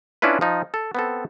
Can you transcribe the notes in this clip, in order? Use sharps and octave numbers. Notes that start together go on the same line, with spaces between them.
C#4 D4 E4 F4 B4
F3 D#4
A4
B3 C4 A4